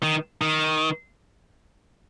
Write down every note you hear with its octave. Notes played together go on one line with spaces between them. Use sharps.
D#3
D#3